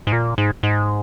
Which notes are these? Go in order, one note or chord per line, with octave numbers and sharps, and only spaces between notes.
G#2
A#2
G#2
G#2